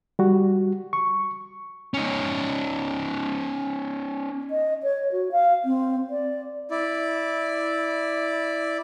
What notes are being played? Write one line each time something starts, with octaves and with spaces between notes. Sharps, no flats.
G3 F#4
C#6
C#4 D#4
D#5
C#5
F#4
F5
C4
D5
E4 D5